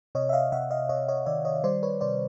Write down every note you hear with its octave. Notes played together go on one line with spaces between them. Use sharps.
C3 C#5 D#5
E5
D#5 F5
C3 E5 F#5
D#5 F5
C3 C#5 D#5
C#5 D#5
D#3 D5 E5
C#5 D#5
G3 C5 D5
B4 C#5
C3 C5 D5